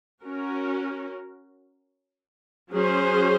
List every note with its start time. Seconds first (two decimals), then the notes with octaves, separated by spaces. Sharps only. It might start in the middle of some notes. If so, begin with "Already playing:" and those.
0.25 C#4 F#4 A#4
2.72 F#3 C#4 G#4 C5